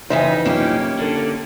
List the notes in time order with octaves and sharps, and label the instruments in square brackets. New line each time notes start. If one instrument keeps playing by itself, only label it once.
[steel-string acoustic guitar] F2 C#3 E5 [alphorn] E3 [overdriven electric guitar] D#4 [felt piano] C5 F5 G#5
[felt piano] F#1 C2 F4 [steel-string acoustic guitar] A#3 C#4 G4
[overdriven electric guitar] D3 [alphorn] A4 [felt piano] A#4